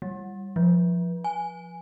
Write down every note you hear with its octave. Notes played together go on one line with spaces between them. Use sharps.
G3
F3
G#5